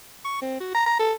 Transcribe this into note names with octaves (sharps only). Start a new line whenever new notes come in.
C#6
C4
F#4
A#5
A#5
A4